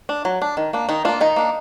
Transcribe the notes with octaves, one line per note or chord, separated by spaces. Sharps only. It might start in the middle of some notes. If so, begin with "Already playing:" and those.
D4
F#3
D4
D#3
A#3 D4
D#3 D#4
A#3 D4 F4
D#3 D#4
A#3 D4